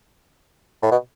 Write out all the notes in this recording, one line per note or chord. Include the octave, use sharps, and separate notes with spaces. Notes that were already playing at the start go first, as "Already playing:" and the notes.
A2
B2